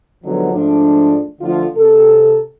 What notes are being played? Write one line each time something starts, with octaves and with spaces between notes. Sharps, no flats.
D3 F3 F#3 G#3 B3 D#4
G#2 F3 A3 D4
D3 F3 A3 F4
C3 A4